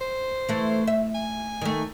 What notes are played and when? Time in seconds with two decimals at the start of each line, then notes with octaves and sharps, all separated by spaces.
0.01 C5
0.49 E3 A3
0.87 E5
1.15 G#5
1.61 D#3 A3